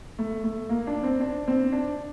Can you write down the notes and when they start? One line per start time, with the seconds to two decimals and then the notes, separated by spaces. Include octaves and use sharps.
0.18 A3
0.44 A3
0.69 A#3
0.87 D4
1.03 C4
1.21 D4
1.48 C4
1.72 D4